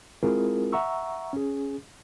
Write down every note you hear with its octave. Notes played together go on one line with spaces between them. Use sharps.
G#3 C4 E4 F4 G#4 A#4
E5 F#5 A#5 C#6 E6
C#4 G#4